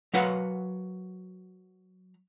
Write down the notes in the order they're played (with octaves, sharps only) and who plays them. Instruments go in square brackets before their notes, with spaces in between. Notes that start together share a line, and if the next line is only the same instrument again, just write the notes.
[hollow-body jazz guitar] F#3 A#4 B4 F5 F#5